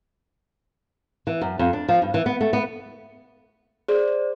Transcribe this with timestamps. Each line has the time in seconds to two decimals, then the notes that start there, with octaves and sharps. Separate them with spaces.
1.27 E3
1.41 F#2
1.59 F2
1.73 D4
1.89 F3
2.02 G2
2.14 E3
2.26 B3
2.41 A3
2.53 B3
3.88 G#4 C5 D5